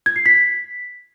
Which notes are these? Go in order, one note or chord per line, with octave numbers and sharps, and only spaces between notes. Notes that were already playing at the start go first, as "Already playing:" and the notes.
G#6
C7
B6